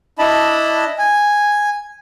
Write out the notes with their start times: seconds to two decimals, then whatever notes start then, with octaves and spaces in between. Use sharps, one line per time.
0.19 D4 E4 D#5 A5 B5
0.99 G#5